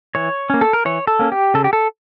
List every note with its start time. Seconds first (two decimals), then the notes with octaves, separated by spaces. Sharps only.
0.15 E3 C#5
0.50 A#3 C#4
0.61 A4
0.73 A#4
0.85 E3 C#5
1.07 A4
1.19 A#3 C#4
1.32 G4
1.54 C#3 A4
1.64 G4
1.73 A4